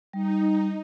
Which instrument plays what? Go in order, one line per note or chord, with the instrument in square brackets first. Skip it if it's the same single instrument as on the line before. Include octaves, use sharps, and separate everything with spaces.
[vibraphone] G3 [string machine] D#4